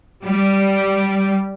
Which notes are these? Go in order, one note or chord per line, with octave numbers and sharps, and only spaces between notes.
G3